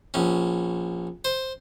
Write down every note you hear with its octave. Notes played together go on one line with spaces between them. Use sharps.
A#1 C#4
C5